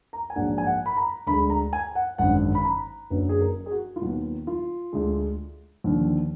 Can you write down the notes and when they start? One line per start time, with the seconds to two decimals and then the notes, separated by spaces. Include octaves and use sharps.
0.13 A#5
0.30 G#5
0.36 A#1 G#2 F#3 A#3 D4 F#5
0.58 G#5
0.66 F#5
0.86 B5
0.97 A#5
1.27 D2 D3 G#3 B5
1.50 A#5
1.73 G#5
1.95 F#5
2.18 G#1 F#2 D3 F#5
2.55 B5
2.64 A#5
3.10 F#1 F#2 D3 F#3 B4
3.29 G#4
3.41 A#4
3.66 G#4
3.71 F#4
3.96 F4
4.01 D#2 D#3 F#3 B3 F#4
4.47 F4
4.93 D2 D3 G#3
5.84 D#2 D3 F3